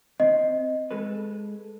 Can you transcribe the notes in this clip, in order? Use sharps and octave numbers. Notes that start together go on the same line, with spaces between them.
C4 D#5
G#3 A4 B4